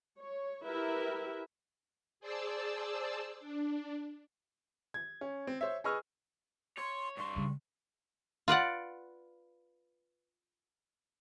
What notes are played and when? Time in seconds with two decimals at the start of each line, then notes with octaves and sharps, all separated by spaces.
0.18 C#5
0.65 E4 G4 A#4 B4 E5
2.20 G#4 C5 D5 A5 E6
3.40 D4
4.94 G#6
5.21 C#4
5.47 C4
5.61 C5 C#5 E5
5.84 G#4 B4 D#5 C#6 E6 F6
6.78 C#5 C6
7.18 G2 C6 C#6
7.36 C#3 G3
8.48 F4 B4 D5 F#5